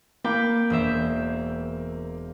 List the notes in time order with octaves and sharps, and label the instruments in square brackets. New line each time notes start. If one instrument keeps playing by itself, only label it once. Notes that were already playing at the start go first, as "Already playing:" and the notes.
[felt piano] A#3 [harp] G5 B5 D6
[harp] E1 C5 E5